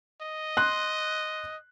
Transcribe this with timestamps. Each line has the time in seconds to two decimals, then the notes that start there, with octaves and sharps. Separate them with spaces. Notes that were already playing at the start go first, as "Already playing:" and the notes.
0.22 D#5
0.57 C6 F#6